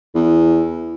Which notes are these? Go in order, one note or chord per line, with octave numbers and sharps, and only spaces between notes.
E2